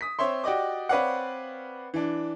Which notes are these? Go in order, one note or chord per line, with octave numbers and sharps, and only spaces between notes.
D#6 B6
C4 C#5 E5 C6
F#4 G4 D5 D#5 D6
C4 B4 C#5 D5 F5 F#5
E3 D4